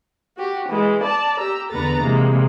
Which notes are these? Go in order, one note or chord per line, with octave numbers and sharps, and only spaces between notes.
F#4 G4
E3 G#3
D5 A5
G4 A#5 E6
E2 D3 B3 B4 A#5 A6
C3 E3 G#3 A#3